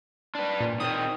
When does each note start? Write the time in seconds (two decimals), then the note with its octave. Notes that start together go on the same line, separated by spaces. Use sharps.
0.35 D4 B4
0.60 A#2
0.80 D#3 C4 D#6